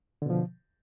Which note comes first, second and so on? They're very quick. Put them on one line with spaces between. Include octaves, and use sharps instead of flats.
D3 B2 F3